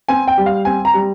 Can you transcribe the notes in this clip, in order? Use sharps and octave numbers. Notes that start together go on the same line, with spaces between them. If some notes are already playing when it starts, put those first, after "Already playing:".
C4 G#5
G5
G3
F5
C4 G#5
A#5
G3